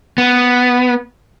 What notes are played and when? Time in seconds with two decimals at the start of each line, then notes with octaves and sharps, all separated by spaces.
0.18 B3